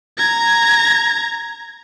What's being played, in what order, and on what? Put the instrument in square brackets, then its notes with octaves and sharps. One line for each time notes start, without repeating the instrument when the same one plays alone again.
[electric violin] A#5 G#6